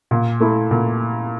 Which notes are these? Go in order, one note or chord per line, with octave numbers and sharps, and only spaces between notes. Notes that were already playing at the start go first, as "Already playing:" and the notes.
A#2
A3 E4
A#2